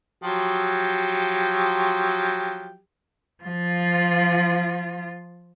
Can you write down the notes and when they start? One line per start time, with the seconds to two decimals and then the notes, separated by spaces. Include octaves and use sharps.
0.24 F3 F#3 G4
3.44 F3 F4